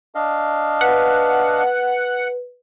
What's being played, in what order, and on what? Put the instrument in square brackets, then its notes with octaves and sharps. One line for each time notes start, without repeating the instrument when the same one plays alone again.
[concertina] D4 D#5 F5
[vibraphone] B4 [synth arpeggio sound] F#5